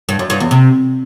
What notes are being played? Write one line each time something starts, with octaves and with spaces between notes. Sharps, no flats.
G2
F#2
G2
E2
C3